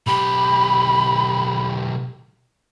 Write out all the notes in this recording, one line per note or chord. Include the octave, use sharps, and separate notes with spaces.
B1 G4 B5